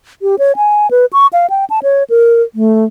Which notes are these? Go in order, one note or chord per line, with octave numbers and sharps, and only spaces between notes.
G4
C#5
G#5
B4
C#6
F5
G5
A5
C#5
A#4
A3